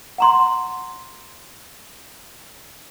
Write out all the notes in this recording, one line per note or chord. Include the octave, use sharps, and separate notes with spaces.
F#5 A#5 C6